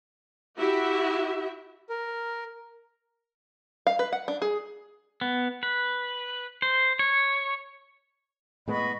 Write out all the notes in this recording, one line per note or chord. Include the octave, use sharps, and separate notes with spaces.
E4 F#4 G4 E5
A#4
F5
B4
F#5
D4
G#4
B3
B4
C5
C#5
A2 G#3 B3 D#5 B5 C#6